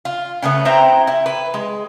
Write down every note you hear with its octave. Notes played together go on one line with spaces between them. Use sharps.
F4
C#3 E3 A3 B3
C4 E4 G5 A#5
E4
B4
G#3